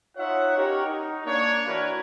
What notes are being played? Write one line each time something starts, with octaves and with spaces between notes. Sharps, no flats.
D#4 F4 C#5 E5 F#5
C#4 D#4 G4 A#4 C#5 F#5
D#4
A#3 D4 C#5
E3 D4 F#4 A#4 B4 C#5